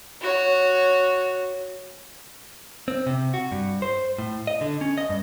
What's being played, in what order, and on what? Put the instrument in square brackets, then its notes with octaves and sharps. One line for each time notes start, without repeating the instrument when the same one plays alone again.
[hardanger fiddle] F#4 C#5
[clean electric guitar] C4
C3
F#4
G2
C5
A2
D#5
D3
C#4
D#5
G2